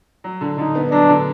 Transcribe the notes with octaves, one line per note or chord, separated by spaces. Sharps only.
F#3
D3
D3 D#4
B3
F#3 D4
D3